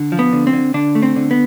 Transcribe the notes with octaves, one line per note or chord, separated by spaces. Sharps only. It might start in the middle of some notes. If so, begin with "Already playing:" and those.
Already playing: D3
F3
B3
D3
C4
D3
D3 D4
A3
C4
D3
B3